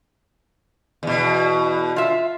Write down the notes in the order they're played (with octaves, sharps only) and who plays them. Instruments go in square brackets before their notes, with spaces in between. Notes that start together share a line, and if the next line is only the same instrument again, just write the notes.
[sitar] E2 B2
[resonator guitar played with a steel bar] F4 E5